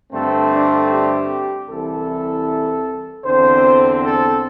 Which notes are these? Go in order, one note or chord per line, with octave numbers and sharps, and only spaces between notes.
G2 D3 A3 C4 A4
D4
G4
C2 C3 E3 A4
E2 D3 C4 C5
A4